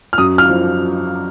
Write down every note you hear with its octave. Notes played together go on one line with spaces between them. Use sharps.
F6
F#2 D#6
F6
F3